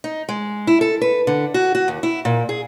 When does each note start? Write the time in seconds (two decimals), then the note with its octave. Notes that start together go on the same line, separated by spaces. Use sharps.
0.04 D#4
0.29 G#3
0.67 E4
0.81 A4
1.02 B4
1.27 D3
1.54 F#4
1.75 F#4
1.88 D#2
2.03 E4
2.25 A#2
2.49 G#4